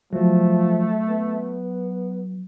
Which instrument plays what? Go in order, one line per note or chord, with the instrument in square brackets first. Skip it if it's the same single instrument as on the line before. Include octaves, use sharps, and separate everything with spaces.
[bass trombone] F3 [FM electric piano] F#3 [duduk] A3
[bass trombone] B3